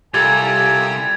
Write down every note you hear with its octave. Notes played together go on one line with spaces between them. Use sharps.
C2 F4 G4 A4 G#5 G#6 A6 F7